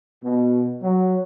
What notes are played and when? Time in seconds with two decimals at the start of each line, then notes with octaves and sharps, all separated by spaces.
0.24 B2
0.82 F#3